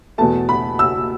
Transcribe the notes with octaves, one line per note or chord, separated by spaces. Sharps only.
E2 B2 A3 A5
B5
E6